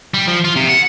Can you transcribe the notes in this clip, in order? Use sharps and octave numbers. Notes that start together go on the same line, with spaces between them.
G3
F3
F4
C3
F#5